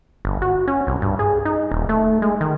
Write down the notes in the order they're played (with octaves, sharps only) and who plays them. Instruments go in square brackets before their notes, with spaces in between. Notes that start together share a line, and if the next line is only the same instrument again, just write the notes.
[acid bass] G1
F#4
C#4
C2
G2
G#4
D#4
D#1
A3
G#3
D#3